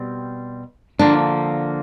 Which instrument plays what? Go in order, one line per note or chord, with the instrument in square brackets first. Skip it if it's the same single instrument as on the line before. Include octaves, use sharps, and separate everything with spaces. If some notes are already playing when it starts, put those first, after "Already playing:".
Already playing: [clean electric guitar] B2 G3 C4
[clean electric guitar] D3 F3 A#3 [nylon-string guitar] D4